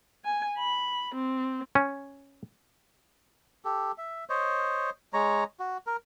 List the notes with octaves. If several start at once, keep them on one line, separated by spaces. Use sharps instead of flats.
G#5
B5
C4
C#4
G4 A4
E5
C5 C#5 D#5
G#3 C#5 A#5
F#4
A#4